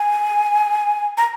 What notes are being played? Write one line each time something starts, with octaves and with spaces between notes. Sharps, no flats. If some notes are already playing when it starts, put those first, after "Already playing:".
Already playing: G#5
A#5